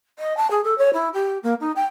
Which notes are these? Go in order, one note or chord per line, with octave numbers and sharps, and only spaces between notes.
D#5
A5
G#4
A4
C#5
E4
G4
A#3
D#4
G5